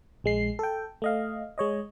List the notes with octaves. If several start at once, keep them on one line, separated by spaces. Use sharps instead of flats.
A#1 G#3 C7
A4 G5
A3 D#5 F5
G#3 C#5 D#5